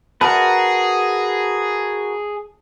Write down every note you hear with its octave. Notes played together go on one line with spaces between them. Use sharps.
F#4 G#4 A#4 B4 A5